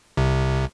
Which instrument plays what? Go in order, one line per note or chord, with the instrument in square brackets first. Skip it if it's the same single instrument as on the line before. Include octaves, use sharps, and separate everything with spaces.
[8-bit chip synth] C2 C3